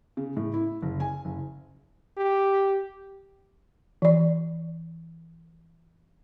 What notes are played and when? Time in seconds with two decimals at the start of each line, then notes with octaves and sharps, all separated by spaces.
0.17 C#3
0.37 A2
0.54 E4
0.82 F#1
1.00 G#5
1.25 F#1
2.17 G4
4.02 E3 D5